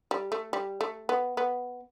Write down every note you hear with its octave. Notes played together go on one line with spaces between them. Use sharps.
G3
A3
G3
A3
B3
B3